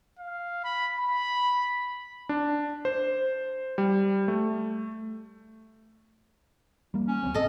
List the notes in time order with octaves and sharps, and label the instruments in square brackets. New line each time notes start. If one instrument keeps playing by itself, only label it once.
[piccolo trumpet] F5
B5
B5
[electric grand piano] D4
C5
G3
A3
[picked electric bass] G3 A#3
[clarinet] C#4
[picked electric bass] D2 F#3 C4
[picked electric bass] G#1 [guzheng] A4 D#5